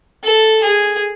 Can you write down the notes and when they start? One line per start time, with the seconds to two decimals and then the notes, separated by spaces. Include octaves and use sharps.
0.24 A4
0.63 G#4